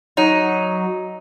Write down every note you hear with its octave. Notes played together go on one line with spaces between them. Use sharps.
F#3 D#4